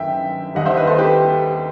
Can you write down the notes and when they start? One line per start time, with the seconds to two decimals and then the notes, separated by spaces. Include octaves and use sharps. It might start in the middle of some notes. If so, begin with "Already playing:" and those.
Already playing: G1 F#2 D#3 E5 G5
0.55 D#2 D#3 G3 D#5 F#5
0.66 C5 E5
0.77 B4 D#5
0.87 A4 C5
0.98 G4 B4